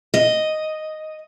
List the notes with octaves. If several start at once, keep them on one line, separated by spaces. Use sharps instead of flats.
D#5